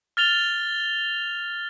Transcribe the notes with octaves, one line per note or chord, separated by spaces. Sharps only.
F6 A6 F7 G7